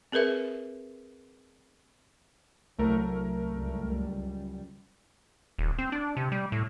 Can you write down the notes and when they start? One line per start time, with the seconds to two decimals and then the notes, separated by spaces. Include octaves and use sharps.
0.12 C4 G#4 A#4 B4 E5
2.78 C2 F#3 A3 A#4
3.48 C#2 F#2 G3
5.59 D#1
5.78 C4
5.92 D4
6.17 C3
6.32 G3
6.52 A2